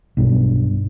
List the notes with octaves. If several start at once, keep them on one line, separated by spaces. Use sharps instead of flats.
B1 G2